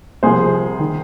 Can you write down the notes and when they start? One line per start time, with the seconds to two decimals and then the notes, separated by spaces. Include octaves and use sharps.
0.23 C2 C3 F3 G#4 C5
0.79 D#3